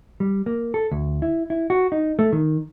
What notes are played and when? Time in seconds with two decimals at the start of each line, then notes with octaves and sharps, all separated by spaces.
0.20 G3
0.46 A#3
0.74 A4
0.91 D2
1.22 E4
1.50 E4
1.70 F#4
1.92 D#4
2.19 A3
2.33 D#3